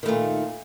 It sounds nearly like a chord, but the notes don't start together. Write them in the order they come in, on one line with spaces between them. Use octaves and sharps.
D#3 A3 A#2